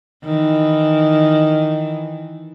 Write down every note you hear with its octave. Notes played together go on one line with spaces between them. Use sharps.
D#3 E3